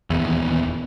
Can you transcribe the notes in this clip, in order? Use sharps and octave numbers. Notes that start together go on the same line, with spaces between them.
D#1 E2